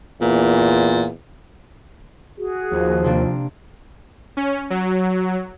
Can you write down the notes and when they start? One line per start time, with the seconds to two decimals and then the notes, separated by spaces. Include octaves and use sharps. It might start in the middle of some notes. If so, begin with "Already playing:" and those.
0.21 E2 A#2
2.37 F#4 G#4
2.72 D#2 F3
3.04 C3 A#3 D4
4.37 C#4
4.70 F#3